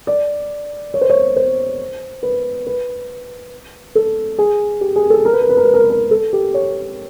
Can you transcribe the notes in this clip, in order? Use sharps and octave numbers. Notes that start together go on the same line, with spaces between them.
D5
C#5
C5
C#5
C5
B4
B4
A4
G#4
G4
G#4
A4
A#4
B4
A#4
B4
A#4
B4
A#4
B4
A#4
A4
G4
C#5